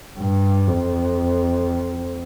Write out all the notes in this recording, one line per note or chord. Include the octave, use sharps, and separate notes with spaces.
G2
F2